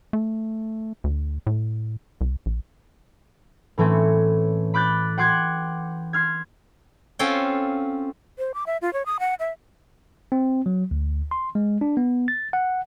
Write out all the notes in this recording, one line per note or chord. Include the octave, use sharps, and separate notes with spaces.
A3
D2
A2
C2
A#1
A2 E3 A3 C4 C#4
B5 D6 F#6 G6 A6
F#5 G5 C6 D6 F#6 G#6
C6 F6 G#6
C4 C#4 F4 A4 F#5 G5
C5
D6
E5
F4
C#5
D#6
F#5
E5
C4
F#3
D2
C6
G#3
D4
B3
A6
F#5